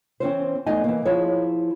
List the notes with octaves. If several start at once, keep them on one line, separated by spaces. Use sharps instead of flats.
E3 C4 C#4 C5
E2 G#3 A3 D#4 D#5 G#5
E3 A#3
F3 E4 G#4 C#5